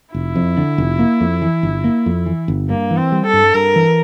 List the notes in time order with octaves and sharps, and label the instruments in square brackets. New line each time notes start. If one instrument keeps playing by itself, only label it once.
[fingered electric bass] F1 [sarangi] E4
[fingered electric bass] F2
D3
F1
A#3
F2
E3
G1
A#3
F2
E3
G1
[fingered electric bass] G2 [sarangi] A#3
[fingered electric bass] E3
[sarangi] C4
[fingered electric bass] G3
[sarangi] A4
[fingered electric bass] G2
[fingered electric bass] G2 [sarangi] A#4
[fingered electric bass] E3